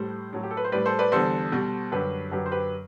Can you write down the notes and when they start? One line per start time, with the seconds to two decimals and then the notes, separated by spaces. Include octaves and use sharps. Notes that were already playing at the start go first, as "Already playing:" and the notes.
Already playing: A2 G3 A4 C5
0.33 A2 F#3
0.43 G4
0.51 A4
0.57 B4
0.64 C5
0.72 A2 G3 B4 D5
0.86 A4 C5
0.99 B4 D5
1.12 E2 D3 G3 A4 C5
1.52 B2 G3
1.92 F#2 D3 G3 G4 B4
2.32 F#2 D3 F#3 G4 B4
2.46 C5
2.52 G4 B4